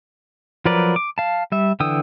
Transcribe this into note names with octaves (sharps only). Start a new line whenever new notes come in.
F3 F#3 A#4 B4 D5
D6
F5 A5
G3 E5
D3 E3 G5 D#6 E6